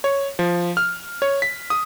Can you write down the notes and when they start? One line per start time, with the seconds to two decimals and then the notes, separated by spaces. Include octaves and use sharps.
0.04 C#5
0.39 F3
0.77 F6
1.22 C#5
1.42 B6
1.70 D#6